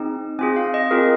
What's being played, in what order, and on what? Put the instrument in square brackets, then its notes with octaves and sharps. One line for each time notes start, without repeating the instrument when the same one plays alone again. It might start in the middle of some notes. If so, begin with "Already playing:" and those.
Already playing: [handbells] C4 D#4 G#4
C4 F4 G#4 G#5
F5
D#5
C4 F4 G#4 A#4